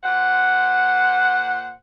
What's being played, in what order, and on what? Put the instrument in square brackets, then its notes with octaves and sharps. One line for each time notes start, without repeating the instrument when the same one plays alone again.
[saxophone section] A#2 C5 F#5